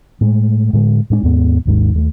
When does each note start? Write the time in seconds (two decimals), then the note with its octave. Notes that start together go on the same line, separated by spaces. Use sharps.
0.21 A2 G#3 A3
0.73 A2 D3 G#3
1.10 A2 G#3 D4
1.23 D#2 G#2 B3
1.66 G#1 D#2 G#2
1.94 D#2 G#3 A3